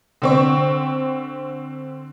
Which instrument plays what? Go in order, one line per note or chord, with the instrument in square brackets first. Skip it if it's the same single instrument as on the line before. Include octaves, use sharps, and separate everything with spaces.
[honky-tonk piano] D3 C4 C#6